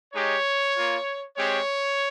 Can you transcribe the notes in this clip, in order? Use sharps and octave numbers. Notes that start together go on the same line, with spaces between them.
G#3 D#4 G4 C#5
A#3 F4
G#3 C4 G4 C#5